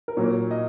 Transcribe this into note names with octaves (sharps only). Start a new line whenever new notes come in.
A#4
A#2 F#3 A#3 C#5
D#5